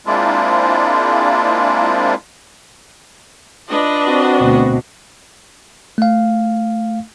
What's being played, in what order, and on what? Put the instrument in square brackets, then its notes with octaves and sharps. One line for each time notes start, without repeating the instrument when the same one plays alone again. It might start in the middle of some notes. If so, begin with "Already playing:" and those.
[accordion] G#3 A#3 C4 D4 E4 F4
[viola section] D4 B4 D#5 [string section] F4
[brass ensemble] C4 F#4
[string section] D2 B2
[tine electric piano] A3 F5